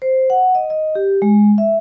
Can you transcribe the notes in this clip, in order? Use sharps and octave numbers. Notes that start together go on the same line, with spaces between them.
C5
F#5
D#5
D#5
G4
G#3
E5